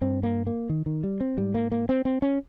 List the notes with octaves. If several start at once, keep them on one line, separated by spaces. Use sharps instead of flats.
G2 C4
A#3
A#3
D#3
D#3
G3
C4
G#2 G3
A#3
A#3
C4
C4
C#4